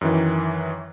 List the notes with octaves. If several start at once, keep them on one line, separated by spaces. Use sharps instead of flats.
F#2 D#3 E3